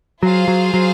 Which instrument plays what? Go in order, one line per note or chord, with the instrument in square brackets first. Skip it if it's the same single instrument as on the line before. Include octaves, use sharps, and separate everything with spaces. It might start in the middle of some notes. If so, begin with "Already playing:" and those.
[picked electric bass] F#3 [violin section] F4 G#4 C5 F5
[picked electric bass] F#3
F#3